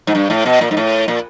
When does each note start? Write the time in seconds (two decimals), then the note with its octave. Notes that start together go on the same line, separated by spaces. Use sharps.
0.07 G#2
0.15 G2
0.30 A2
0.46 B2
0.61 A#2
0.71 G#2
0.77 A2
1.08 A#2